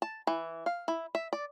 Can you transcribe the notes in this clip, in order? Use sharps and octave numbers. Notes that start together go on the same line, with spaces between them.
A5
E3
F5
E4
E5
D5